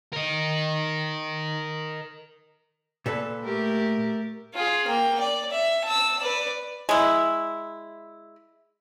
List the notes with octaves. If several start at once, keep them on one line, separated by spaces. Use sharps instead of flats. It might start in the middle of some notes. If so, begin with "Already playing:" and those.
A#4 D#5
A#2 A4 B4
A3 G4 A#4
F4 G#4
A#3 G5
D5
E5
A5 E6
B4 D5
G#3 E4